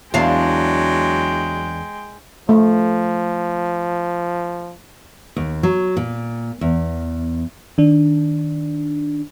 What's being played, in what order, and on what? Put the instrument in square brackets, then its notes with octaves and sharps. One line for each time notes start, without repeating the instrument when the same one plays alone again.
[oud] E2 D4 F5 [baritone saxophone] F#3 [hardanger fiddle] G#3 G5
[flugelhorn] F3 [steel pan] A3
[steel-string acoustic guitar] D#2
F#3
A#2
E2
[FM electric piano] D#3 D4